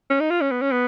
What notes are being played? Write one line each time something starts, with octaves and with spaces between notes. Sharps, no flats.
C#4
D#4
F4
C#4
B3
C#4
B3